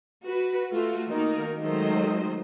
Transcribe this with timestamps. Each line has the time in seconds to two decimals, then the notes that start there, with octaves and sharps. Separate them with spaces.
0.23 F#4 B4
0.71 A3 F4 F#4
1.09 D#3 A#3 D#4 F#4 A#4
1.60 D#3 F#3 G#3 A3 C5 D#5